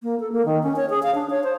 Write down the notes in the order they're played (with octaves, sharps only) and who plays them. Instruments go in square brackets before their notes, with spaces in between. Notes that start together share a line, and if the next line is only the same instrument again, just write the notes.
[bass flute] A#3
A4
A#3
D#3
C#4
C#5
G#4
F5
D4
C#5
C5